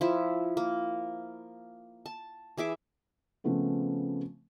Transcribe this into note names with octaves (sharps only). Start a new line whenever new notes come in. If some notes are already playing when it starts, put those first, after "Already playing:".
F3 E4
A#3
A5
E3 G#4 E5 D6
C#3 F3 A3 B3 C4